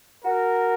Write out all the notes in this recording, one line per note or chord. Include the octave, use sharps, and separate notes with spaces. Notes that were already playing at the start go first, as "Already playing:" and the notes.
F#4 A#4